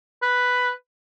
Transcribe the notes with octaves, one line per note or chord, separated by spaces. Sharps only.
B4